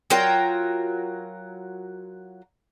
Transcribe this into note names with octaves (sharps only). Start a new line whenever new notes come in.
F#3 F4 A#4 G5